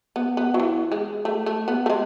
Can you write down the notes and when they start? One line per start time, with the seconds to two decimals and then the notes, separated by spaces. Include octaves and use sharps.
0.16 B3
0.37 B3
0.54 F#3
0.60 E3
0.92 G#3
1.25 A3
1.46 A3
1.68 B3
1.86 A3
1.90 G#3